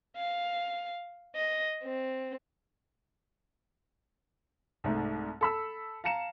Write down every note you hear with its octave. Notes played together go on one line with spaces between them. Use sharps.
F5
D#5
C4
C2 G#2 A3
A4 B5 E6
F5 A5 A#5 C#7 E7